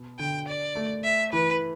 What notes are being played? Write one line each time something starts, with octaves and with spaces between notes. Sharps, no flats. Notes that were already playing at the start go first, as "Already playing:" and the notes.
Already playing: B2
D3 G5
D5
A3
E5
E3 B4